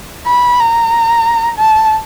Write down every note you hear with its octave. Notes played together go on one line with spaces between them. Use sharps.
B5
A#5
A5